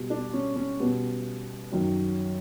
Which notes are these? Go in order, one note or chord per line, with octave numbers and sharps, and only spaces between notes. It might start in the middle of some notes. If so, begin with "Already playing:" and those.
Already playing: B2 G3
D4
C#4
C#4
B2 G3 B3
F#2 D#3 F#3